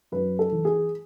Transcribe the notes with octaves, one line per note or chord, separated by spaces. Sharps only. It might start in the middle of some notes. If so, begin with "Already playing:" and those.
F#2 B4
A4
E3
G#4